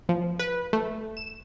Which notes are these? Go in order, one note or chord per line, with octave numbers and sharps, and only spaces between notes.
F3
B4
A3
E7